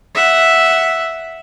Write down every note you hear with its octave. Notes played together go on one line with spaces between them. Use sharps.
E5 F#5